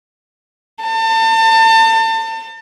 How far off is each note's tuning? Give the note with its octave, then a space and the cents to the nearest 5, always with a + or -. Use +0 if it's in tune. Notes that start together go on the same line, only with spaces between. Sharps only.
A5 +35